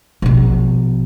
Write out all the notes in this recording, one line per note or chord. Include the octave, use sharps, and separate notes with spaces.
A#1 B2